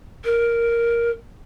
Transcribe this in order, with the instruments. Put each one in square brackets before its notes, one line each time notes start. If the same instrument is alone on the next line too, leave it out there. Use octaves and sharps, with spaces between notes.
[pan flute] A#4